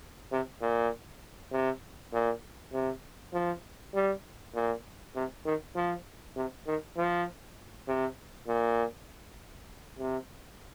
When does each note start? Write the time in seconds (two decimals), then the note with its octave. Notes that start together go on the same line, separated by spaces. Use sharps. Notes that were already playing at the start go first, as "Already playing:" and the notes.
0.32 C3
0.61 A#2
1.52 C3
2.13 A#2
2.73 C3
3.34 F3
3.94 G3
4.54 A#2
5.15 C3
5.45 D#3
5.76 F3
6.36 C3
6.67 D#3
6.97 F3
7.88 C3
8.47 A#2
9.99 C3